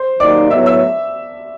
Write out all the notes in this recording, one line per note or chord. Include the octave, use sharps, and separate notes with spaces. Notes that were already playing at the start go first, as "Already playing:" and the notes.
Already playing: C5 C6
D#3 F#3 A#3 D#4 G4 D5 D6
A2 F#3 B3 E5 E6
E5 E6